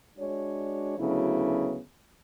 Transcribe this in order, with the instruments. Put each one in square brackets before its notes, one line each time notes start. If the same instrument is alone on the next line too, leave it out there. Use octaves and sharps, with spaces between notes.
[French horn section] G#3 D4 F#4 C#5
D2 C#3 F#3 B3 E4